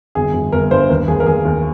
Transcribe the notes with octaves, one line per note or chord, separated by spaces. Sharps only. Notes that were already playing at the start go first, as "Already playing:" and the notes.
G1 G#4
G1
G1 A#4
G2 C5
D#2 A#4
D#2 G#4
A#4
D#2 G#4
D#2